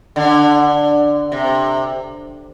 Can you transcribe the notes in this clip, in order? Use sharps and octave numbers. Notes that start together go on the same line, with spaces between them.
D3
C3